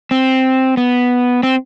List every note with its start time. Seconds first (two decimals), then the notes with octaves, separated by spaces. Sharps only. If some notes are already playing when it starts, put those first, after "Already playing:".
0.11 C4
0.77 B3
1.43 C4